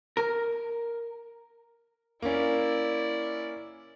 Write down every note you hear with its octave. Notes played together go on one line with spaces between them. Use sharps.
A#4
A#3 C#4 E4 D5